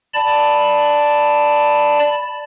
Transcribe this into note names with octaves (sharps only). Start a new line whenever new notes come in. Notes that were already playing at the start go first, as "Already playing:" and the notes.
D5 A5 B5